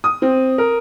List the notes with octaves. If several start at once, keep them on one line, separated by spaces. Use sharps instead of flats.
D#6
C4
A#4